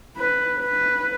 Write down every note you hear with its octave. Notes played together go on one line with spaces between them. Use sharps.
B4
B4